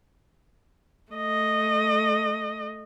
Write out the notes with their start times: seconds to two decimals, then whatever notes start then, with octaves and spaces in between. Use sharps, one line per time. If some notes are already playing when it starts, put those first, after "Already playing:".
1.12 A3 D#5